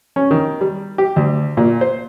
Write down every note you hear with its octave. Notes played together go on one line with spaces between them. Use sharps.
C#4
D#3
G3
G4
D2
A#2
C5